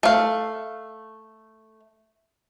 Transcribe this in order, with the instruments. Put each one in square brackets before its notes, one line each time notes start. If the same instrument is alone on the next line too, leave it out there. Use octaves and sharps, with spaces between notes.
[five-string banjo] A3 F5